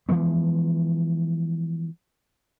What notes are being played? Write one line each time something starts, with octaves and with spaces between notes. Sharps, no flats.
E3 F3 G#3 B3